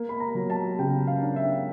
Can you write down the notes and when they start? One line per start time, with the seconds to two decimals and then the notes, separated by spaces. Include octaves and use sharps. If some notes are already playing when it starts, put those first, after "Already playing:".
Already playing: A#3
0.09 B5
0.20 A#5
0.35 F#3
0.50 A5
0.79 C#3 G5
1.07 F5
1.22 D4
1.36 E5